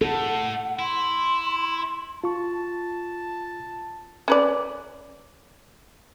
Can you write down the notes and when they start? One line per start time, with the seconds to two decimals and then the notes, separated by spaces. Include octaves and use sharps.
0.01 A2 A3 A4 F#5
0.79 E4 C6
2.24 F4 A5 C#6
4.28 C#4 B4 D5